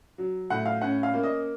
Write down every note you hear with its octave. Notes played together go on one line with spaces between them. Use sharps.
F#3
A2 F#5
F5
C#4 F#5
F5
A#3
D#5